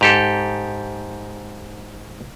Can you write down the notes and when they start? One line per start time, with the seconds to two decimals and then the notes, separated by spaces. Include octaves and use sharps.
0.01 G#2 G4 A4